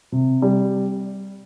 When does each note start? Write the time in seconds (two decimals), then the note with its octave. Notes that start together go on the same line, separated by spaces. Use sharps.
0.12 C3
0.42 G3